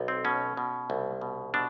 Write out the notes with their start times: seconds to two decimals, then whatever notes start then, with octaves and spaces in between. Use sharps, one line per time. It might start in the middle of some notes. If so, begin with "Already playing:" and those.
Already playing: B1
0.08 C4
0.25 B2 C#4
0.57 B2
0.90 C2
1.21 B2
1.54 B2 D4